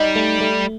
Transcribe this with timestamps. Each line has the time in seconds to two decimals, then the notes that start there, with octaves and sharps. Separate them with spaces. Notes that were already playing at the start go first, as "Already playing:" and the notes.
Already playing: G3 D#4
0.16 A3
0.41 A3